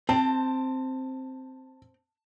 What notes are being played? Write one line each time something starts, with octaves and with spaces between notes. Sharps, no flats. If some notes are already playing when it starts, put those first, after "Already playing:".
C4 A5